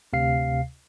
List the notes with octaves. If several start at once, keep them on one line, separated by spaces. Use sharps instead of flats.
D2 C3 F5 C7